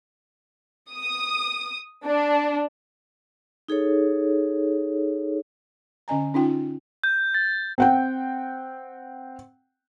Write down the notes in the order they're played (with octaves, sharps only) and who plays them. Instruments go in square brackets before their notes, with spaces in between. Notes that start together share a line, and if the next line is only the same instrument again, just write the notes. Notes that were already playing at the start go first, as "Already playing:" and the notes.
[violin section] D#6
D4
[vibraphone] D#4 G#4 A4 C#5
[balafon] D3 C#4 D#5 G#5 A#5
C#4 D#4 F4 G5
[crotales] G6
A6
[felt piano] C4 F#5 G5